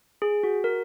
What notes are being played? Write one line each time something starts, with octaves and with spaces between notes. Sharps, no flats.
G#4
F#4
A#4